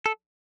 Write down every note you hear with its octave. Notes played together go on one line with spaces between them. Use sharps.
A4